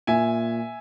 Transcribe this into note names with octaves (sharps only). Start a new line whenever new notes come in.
A#2 E5 G#5